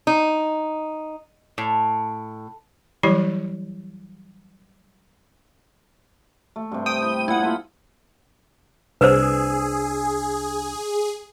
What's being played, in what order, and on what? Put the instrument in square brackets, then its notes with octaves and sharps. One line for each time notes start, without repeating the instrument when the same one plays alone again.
[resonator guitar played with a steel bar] D#4
A2
[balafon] E3 F#3 G3 E4 G4 C#5
[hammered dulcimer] A3
G2 C3
[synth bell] G5 D#6 D#7
[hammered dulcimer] E4
[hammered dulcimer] A#2 [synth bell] E4 F#5
[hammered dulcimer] F4 A4 B5
[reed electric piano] C2 D4 E6 [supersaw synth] G#4 [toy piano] B4 C5